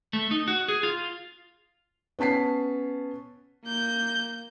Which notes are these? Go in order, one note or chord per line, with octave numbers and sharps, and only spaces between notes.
A3
D#4
F#4
G#4
F4
B3 C#4 A5 B6 C7
A#3 G6